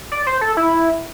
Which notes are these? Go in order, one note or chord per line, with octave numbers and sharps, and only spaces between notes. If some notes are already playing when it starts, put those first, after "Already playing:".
D5
C5
A4
E4